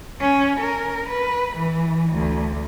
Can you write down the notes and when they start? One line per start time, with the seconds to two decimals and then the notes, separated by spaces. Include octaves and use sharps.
0.20 C#4
0.60 A#4
1.09 B4
1.56 E3
2.13 D2